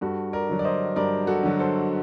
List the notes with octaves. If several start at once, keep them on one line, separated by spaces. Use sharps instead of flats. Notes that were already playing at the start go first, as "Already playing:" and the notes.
G2 F#4 A4
A#4 D5
D3 F#3
D5
C5 D#5
G2 A#4 D5
F#4 A4
D3 F#3
A4 C5